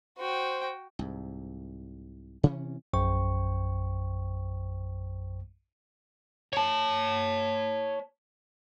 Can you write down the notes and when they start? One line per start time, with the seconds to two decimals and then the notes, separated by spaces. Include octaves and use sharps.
0.19 F#4 C5 G5
0.99 C2 G#2
2.43 C3 E3 C#4
2.93 A#1 F#2 C5 G5 C#6
6.53 C#5 A5